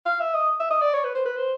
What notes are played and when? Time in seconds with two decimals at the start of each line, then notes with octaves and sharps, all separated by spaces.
0.06 F5
0.20 E5
0.34 D#5
0.60 E5
0.70 D#5
0.81 D5
0.93 C#5
1.04 B4
1.15 C5
1.25 B4
1.37 C5